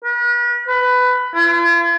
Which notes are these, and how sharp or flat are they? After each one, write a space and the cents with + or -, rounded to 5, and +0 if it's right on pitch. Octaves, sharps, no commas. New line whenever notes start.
B4 -40
B4 +15
F4 -45